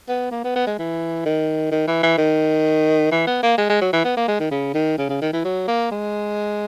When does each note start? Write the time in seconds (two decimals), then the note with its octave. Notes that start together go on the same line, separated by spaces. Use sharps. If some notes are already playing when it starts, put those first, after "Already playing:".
0.09 B3
0.31 A#3
0.44 B3
0.56 B3
0.67 G#3
0.79 E3
1.26 D#3
1.72 D#3
1.87 E3
2.03 E3
2.18 D#3
3.12 E3
3.27 B3
3.43 A#3
3.58 G#3
3.70 G#3
3.81 F#3
3.93 E3
4.04 B3
4.17 A#3
4.28 G#3
4.40 D#3
4.51 C#3
4.74 D#3
4.98 C#3
5.09 C#3
5.22 D#3
5.33 E3
5.45 F#3
5.68 A#3
5.91 G#3